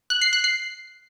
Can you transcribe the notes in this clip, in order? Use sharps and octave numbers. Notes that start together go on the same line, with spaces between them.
F#6
C7
F#6
C7